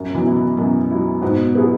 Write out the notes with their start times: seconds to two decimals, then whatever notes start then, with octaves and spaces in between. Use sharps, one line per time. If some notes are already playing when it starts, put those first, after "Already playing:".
Already playing: F#2
0.10 F#3
0.14 B2 E3
0.26 F#3 E4
0.36 B2
0.57 F#2 B2
0.90 F#3 E4
1.22 G#2 B2
1.38 B2
1.55 F#3 B3 E4 G#4